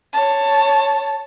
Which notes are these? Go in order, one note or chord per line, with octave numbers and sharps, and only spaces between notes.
C#5 A5